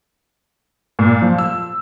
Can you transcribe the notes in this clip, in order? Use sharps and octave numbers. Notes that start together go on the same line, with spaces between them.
A#2
F3
E6